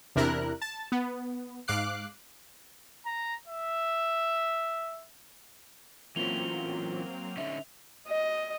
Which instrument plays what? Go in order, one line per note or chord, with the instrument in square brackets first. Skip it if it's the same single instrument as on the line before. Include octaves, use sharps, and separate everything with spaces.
[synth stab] E2 C3 D4 E4 A#4 F#6
A5
B3
G#2 F5 D6 F#6 C7
[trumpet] A#5
E5
[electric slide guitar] E3 C#4 [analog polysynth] F#3 A#3 C4 [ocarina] F4 [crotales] F7 G7
[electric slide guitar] D3 C#4 D#4 [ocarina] E5
[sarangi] D#5